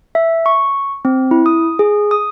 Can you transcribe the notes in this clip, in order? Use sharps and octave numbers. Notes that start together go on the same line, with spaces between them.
E5
C#6
C4
E4
D#6
G#4
D#6